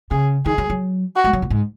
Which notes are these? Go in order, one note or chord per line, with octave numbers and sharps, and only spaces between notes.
C#3 G#4
D#3 G#4
F#3
F#3
F#4
G#3
F#3
A#2
G#2